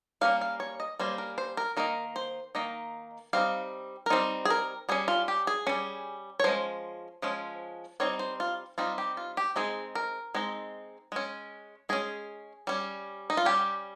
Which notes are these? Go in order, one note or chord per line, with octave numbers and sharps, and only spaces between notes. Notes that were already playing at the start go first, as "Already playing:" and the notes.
G3 A#3 C#4 F5
F5
C#5
D#5
G3 A#3 C#4 C5
A#4
C5
A#4
D#3 A#3 D#4 A#4
C5
D#3 A#3 D#4 D#5
G3 C4 D#4 F5
A#4
G3 C4 D#4 C5
G#4
A#4
G3 C#4 G#4
F4
G4
G#4
G3 C#4
C#5
F3 G#3 C#4 C5
F3 G#3 C#4
G3 C4 D#4 C#5
C5
F4
G3 C4 D#4 F4
G4
F4
G4
G#3 C4 D#4 G#4
A#4
G#3 C4 D#4
G#3 C#4
G#3 C#4 G#4
G3 C#4
D#4
F4
G3 C#4 G4